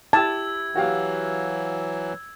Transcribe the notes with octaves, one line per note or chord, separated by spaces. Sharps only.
E4 G4 A5 E6 G#6
E3 F#3 F#4 G4 F5